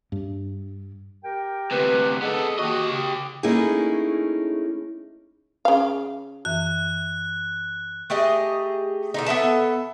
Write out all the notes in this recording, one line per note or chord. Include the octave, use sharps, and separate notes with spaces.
G2
G4 A#4 G5
D2 C3 B4
B3 G#4 A4 D#5
D#3 A#3 F#4 G4 D#5
C#3
A3 A#3 C#4 D#4 E4 G#4
C#3 F5
F#2 E3 E5 F#6
A3 G4 G#4 D#5
B2 D3 D#4
B3 A4 E5 A5